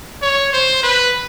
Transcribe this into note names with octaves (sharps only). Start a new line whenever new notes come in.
C#5
C5
B4